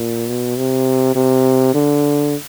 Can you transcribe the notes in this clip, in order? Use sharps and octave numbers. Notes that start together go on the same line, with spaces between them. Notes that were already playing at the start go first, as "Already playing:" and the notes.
Already playing: A#2
B2
C3
C3
D3